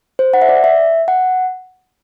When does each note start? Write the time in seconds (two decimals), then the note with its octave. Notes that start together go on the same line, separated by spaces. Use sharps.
0.19 C5
0.34 F#5
0.42 E5
0.49 D5
0.64 E5
1.08 F#5